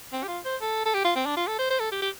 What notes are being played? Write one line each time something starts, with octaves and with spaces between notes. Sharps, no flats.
C4
G4
F4
C5
A4
A4
G4
F4
C4
D4
F4
A4
C5
C5
A4
G4
G4